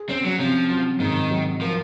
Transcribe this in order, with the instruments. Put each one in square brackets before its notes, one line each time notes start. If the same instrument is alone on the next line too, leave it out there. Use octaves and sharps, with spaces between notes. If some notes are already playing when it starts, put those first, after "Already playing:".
Already playing: [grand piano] G#4
[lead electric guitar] C4 [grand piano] C#4
[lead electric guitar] F#3
[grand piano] C3 [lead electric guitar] F3
[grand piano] F#3
[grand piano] G#2 [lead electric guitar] D#3
[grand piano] F#3
[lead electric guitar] F3 [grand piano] A#4